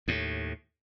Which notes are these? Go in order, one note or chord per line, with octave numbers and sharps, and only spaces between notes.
D#2 A2